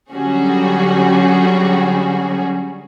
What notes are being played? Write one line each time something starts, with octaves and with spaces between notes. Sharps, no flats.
D3 F#3 G3 C#4 F#4 G#4